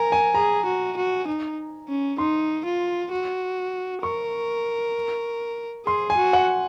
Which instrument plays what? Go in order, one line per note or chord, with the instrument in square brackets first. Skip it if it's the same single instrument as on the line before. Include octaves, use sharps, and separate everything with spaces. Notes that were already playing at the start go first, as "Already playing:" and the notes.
Already playing: [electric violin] A#4 [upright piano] G#5 A#5
[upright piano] G#5
[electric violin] G#4 [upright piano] A#5
[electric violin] F#4
F#4
D#4
C#4
[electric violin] D#4 [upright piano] C6
[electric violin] F4
F#4
[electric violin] A#4 [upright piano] C#6
[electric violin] G#4 [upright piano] C6
[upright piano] G#5
[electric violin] F#4
[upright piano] F#5